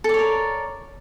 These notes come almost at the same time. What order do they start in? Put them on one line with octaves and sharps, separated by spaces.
A4 D5 C#5 A#4